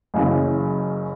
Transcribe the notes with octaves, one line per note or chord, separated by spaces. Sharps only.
F#1 F#2 C#3 E3